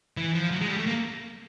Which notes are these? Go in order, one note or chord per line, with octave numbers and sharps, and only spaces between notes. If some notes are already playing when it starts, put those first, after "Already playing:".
E3
F3
F#3
G#3
G3
A3
A#3